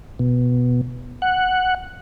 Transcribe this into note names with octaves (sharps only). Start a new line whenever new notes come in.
B2
F#5